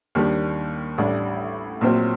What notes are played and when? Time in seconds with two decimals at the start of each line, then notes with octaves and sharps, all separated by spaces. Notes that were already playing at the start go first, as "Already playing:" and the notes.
0.15 D#2 D#3 G3 D4 G4
0.98 A1 A2 G3 D4
1.81 A#1 A#2 F#3 C4